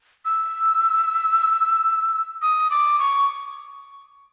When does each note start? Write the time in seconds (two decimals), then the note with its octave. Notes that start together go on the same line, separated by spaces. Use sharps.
0.25 E6
2.42 D#6
2.70 D6
2.99 C#6